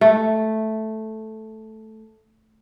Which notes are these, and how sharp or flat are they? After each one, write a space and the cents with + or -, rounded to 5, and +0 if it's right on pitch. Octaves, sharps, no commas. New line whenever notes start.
A3 -5